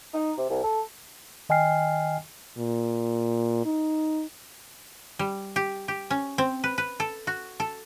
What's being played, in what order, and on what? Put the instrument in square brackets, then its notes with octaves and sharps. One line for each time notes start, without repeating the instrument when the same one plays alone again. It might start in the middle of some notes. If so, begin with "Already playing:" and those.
[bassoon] D#4
C3
C2
A4
[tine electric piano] D#3 D#5 G5 G#5 F6 C7
[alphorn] A#2
D#4
[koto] G3
G4
G4
C#4
C4
B4
B4
A4
F#4
A4